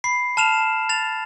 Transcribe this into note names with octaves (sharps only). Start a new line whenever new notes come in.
B5 C7
A5 F6 E7 F7
A6 F7